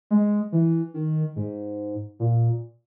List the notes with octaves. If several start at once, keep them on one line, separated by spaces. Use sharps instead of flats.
G#3
E3
D#3
G#2
A#2